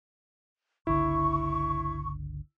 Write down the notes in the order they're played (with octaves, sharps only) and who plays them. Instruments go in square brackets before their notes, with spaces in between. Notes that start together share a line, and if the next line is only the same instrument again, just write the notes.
[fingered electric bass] G1 C#2 D3 [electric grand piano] E4 [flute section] C#6